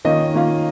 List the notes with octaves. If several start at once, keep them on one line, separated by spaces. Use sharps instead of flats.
D#3 A#3 C#4 F4 D#5
D#3 A#3 C#4 F4